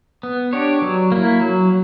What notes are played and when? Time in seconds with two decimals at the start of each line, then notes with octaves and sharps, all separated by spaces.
0.23 B3
0.53 D4 G4 C#5
0.82 F#3
1.12 A#3 E4
1.41 F#3